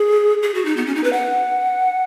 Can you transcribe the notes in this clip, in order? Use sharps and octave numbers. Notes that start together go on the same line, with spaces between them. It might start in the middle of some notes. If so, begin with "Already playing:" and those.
Already playing: G#4
G#4
F#4
D#4
B3
C#4
D#4
B4
F#5